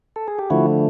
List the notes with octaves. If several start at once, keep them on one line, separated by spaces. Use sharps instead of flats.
A4
G#4
G4
D3 F3 A3 E4 F#4